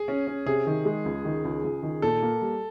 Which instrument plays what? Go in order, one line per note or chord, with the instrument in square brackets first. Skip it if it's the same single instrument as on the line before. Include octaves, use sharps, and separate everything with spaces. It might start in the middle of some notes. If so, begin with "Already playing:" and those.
Already playing: [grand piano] G#4
[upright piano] C#4
C#4
[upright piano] C3 [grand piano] G#4
[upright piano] D#3
G#3
C#2
D#3
C#2
C#2
D#3
[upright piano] A#2 [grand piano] A4
[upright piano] A#3
G3